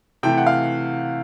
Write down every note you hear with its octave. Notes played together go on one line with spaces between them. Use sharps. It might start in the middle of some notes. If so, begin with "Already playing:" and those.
C3 E3 A3 G5
F#5
F5